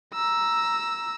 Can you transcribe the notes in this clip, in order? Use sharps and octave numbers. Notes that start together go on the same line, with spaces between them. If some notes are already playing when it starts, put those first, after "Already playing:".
A#5 E6